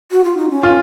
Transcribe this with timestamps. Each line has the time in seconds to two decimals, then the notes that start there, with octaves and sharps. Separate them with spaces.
0.11 F#4
0.24 F4
0.37 D#4
0.50 C#4
0.63 F4